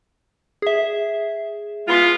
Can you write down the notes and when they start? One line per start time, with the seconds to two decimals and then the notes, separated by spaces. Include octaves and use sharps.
0.62 G#4 E5
1.88 G#3 B3 F4